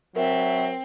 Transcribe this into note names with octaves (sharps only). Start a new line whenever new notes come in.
F#3 C4 A#4 E5